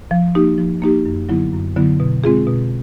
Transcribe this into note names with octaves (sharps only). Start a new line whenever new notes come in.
F3
A#3 D#4 G4
F3
A#3 D#4 G4
F#2
D3 F#3 B3 E4
F#2
D3 F#3 B3 E4
B2
G#3 C4 F4 G#4
B2